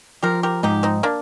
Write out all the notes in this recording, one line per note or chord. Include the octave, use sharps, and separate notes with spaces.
F3 G4 A#4
G4 A#4
G#2 D#4 G4
C4 D#4
A#3 D4